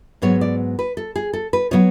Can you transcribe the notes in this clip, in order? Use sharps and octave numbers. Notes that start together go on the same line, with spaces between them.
G#2 F#3 B3 C#5
D5
B4
A4
G#4
A4
B4
C#3 F#3 B3 C#5